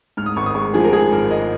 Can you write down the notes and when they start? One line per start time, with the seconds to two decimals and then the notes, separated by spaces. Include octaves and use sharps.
0.17 G#2 F6
0.26 D#6
0.36 G#1 C#6
0.46 D#6
0.55 G#3 C#6
0.74 F3 G#4
0.84 A#4
0.93 G#2 G#4
1.12 G#1 A#4
1.31 G#3 D#5